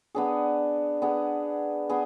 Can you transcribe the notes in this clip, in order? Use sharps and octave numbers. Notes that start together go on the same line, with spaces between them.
B3 D4 G#4
B3 D4 G#4
B3 D4 G#4